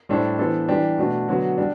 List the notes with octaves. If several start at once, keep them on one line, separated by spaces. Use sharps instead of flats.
A2 G3 D4 A4 C5
E3 B3 D4 A4 C5
E3 G3 D4 G4
B2 A3 D4
D3 F#3 B3 F#4
G3 D4